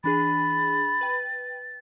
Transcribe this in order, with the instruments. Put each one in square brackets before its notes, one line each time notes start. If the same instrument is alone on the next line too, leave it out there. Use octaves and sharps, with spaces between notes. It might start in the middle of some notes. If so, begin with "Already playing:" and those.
[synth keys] E3 D4 G#4 [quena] B5 [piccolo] A6
[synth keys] B4 G5